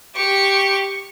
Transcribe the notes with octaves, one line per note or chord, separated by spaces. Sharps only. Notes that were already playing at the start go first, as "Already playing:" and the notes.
G4 C#6